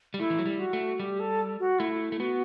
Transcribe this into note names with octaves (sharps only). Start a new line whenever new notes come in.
G3
A3 E4
E3
F#3
G3
F#4
A3
G3 G4
A4
F#4
A3 E4
A3
B3 F#4